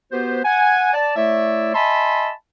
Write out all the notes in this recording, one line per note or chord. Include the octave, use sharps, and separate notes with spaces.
B3 F#4 G4 B4 C5
F#5 G#5
D5 A5
A3 E4 C#5 D5 E5
D#5 E5 G#5 A5 B5 C6